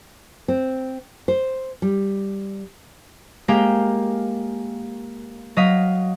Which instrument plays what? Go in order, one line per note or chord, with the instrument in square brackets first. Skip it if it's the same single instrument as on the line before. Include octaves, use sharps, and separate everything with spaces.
[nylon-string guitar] C4
C5
G3
[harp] G#3 A#3 G4 F5 G5
F#3 D#5 F5 D#6 B6